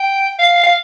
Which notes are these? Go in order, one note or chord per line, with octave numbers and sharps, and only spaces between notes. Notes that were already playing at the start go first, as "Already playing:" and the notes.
Already playing: G5
F5
F5